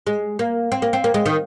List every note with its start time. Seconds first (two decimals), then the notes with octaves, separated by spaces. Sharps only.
0.07 G#3
0.39 A#3
0.72 C4
0.82 A#3
0.93 C4
1.04 A#3
1.14 G#3
1.26 D#3